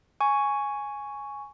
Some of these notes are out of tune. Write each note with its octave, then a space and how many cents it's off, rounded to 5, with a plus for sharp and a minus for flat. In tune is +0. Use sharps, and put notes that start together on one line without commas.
G#5 +0 C#6 +5